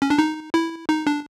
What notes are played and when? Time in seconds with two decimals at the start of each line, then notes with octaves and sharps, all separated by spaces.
0.02 C#4
0.10 D4
0.18 D#4
0.54 E4
0.89 D#4
1.07 D4